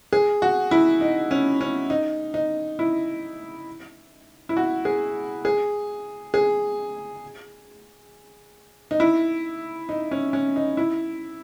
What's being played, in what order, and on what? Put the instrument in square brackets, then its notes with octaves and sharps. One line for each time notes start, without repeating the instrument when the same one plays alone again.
[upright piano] G#4
F#4
E4
D#4
C#4
C#4
D#4
D#4
E4
E4
F#4
G#4
G#4
G#4
D#4
E4
D#4
C#4
C#4
D#4
E4